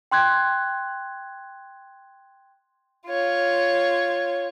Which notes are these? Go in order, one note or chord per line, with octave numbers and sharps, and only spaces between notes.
G5 C6 F#6 G#6
F4 C#5